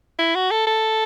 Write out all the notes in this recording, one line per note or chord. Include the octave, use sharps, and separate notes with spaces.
E4
F#4
A4
A4